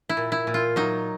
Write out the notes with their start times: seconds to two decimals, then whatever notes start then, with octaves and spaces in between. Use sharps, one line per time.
0.09 E4
0.17 A#2
0.32 E4
0.47 A#2
0.54 F4
0.76 F#3 D#4